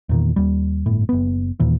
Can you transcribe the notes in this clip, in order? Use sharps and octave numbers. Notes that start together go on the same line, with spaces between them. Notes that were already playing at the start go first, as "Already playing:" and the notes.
E2 A#2 D#3
D#2 G3
G1 A2
F#1 B3
D#2 A#2 E3